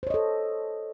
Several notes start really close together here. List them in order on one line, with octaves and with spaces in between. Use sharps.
C5 C#5 D#5 A4